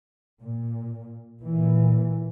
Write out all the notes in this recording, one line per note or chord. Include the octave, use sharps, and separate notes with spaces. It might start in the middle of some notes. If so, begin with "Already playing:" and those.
A#2
A#2 E3